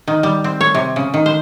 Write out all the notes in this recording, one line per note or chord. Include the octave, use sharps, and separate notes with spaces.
D#3
G3
C4
C#5
C3
C#3
D#3
C5